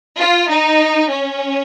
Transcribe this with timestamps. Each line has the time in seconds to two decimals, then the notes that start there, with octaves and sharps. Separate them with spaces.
0.20 F4
0.50 D#4
1.10 C#4